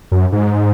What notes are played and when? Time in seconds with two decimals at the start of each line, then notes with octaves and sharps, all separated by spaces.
0.12 F#2
0.32 G#2